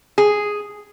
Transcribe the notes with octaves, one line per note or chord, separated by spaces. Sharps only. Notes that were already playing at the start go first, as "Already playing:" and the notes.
G#4